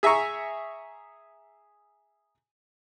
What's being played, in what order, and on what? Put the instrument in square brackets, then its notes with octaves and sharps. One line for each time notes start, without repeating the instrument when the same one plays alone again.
[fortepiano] G#4 E5 G#5 A#5 C#6